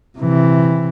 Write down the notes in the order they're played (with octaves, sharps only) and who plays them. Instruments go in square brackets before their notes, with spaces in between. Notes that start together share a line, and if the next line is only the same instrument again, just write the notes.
[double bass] C3 E3